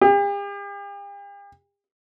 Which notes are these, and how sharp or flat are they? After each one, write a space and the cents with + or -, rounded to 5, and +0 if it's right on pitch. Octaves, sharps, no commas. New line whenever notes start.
G4 +45